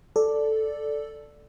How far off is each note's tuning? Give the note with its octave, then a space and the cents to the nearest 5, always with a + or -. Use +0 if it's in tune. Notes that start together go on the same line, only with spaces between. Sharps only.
A4 +0 D5 +0